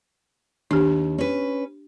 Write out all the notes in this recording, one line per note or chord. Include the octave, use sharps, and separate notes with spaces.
D#2 D4 G4
C#4 B4